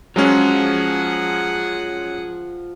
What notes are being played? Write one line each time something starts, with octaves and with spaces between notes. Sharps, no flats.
F#3 G#3 C#4 F4 G#4 C5 F#5